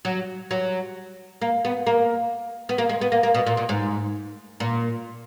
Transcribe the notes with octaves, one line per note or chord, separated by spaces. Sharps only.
F#3
F#3
A#3
B3
A#3
B3
A#3
G#3
B3
A#3
A#3
B2
A#2
A#2
G#2
A#2